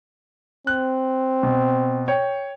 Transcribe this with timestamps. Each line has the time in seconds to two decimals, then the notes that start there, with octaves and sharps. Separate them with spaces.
0.67 C4 F#6
1.43 B2
2.08 C#5 G5